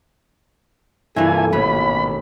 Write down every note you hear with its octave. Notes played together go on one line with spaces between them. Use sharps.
G2 C3 E3 A#3 E4 F4 A4 G#5
A1 D#2 G#2 B2 B5